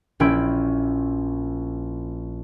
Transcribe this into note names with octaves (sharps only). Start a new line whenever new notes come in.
A#1 C#4 E4 G5 B5 D7